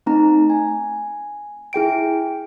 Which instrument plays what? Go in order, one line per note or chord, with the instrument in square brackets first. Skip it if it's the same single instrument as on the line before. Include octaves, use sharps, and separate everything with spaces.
[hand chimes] A3 C4 D#4 A#5
G#5
E4 G#4 G5 D7